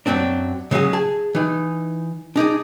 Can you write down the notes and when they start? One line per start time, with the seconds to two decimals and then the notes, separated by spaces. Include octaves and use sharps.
0.06 F#2 F#3 C4 D4
0.71 C#3 F#3 G#3 C#4 G#4
0.93 G#4 A5
1.35 E3 D#4
2.36 D4 D#4 G4 G#4